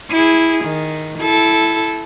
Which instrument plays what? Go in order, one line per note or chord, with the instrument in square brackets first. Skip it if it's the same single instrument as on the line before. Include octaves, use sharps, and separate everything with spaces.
[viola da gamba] E4 G#4
D#3
E4 A4